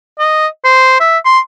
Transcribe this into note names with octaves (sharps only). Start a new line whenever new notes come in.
D#5
C5
E5
C6